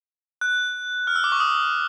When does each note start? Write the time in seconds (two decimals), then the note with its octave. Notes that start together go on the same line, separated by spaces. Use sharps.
0.41 F#6
1.07 F6
1.16 E6
1.24 D6
1.32 C#6
1.40 D#6